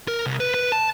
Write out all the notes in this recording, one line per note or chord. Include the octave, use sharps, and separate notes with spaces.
A#4
C2
B4
B4
A5